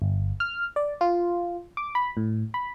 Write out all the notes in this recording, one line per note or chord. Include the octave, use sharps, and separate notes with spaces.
G1
F6
D5
F4
D6
B5
A2
B5